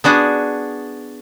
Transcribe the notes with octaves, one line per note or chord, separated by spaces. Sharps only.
B3 D4 F#4 G#4